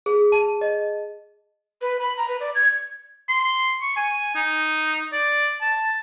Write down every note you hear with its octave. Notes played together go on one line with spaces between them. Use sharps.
G#4
A5
D#5
B4
B5
A#5
B4
D5
G#6
C6
C#6
G#5
D#4
D5
A5